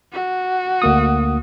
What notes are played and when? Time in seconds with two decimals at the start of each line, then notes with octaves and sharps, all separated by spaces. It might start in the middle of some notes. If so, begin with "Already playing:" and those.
0.12 F#4
0.82 D2 A#3 D#6